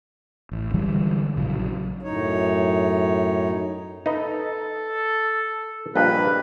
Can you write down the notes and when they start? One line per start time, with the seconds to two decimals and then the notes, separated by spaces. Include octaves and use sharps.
0.52 A1
0.74 D3 E3 G3 G#3
1.36 A#1 C#3 F#3
2.02 F#2 A2 D#4 C#5
4.06 D#4 A4 B4 D#5
5.95 A#1 G2 A#3 B4 D#5